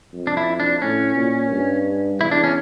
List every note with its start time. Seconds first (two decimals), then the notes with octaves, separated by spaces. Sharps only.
0.14 F2
0.27 D4
0.37 E4
0.60 D4
0.82 A2 C#4
1.16 A#2
1.51 G2
2.20 E2 E4
2.31 D4
2.44 C#4